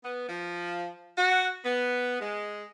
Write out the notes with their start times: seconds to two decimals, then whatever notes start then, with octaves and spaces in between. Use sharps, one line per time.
0.03 B3
0.29 F3
1.17 F#4
1.64 B3
2.20 G#3